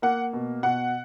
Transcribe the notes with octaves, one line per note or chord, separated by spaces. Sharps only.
A#3 F#5
B2
B2 F#5